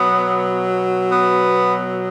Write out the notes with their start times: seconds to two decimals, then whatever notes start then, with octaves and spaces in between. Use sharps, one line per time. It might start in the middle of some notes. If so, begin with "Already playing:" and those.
Already playing: B2 F#3 B3
1.09 B3